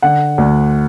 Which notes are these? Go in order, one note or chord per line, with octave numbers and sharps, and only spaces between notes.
D3 F#5
D2